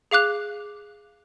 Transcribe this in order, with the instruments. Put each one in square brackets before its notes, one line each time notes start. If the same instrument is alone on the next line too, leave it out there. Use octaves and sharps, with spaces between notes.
[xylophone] G#4 F5 D6 F#6 F7